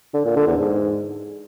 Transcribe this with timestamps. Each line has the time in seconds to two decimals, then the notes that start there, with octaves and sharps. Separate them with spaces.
0.14 D3
0.25 A#2
0.36 D3
0.47 E2
0.58 G#2